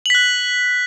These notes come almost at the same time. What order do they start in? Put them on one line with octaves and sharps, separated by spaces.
F#7 B6 F#6